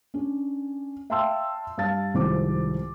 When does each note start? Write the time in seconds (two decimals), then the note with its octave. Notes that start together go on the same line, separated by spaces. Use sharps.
0.14 C#4 D4
1.10 E5 F5 G5 A5 C6 E6
1.78 G2 F5 A5 A6
2.14 C2 G#2 D#3 F3 C5 D6